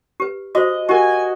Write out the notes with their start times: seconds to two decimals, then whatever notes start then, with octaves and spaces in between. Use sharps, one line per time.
0.20 G4 B4
0.55 F#4 C5 D#5
0.89 F#4 G4 A#4 G#5